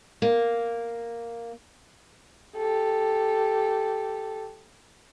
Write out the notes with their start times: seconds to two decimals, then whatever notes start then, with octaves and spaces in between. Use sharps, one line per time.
0.22 A#3
2.57 G4 A4